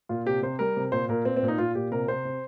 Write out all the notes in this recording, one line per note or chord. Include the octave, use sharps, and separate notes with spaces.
A#2 F4
C3 G4
C3 C5
G3 A#4
C3
A#2 C5
A#2 A#4
A#2 C4
C4
A#2
D#4
A#2 F4
A#2 G4
C3 A#4
C3 C5
C3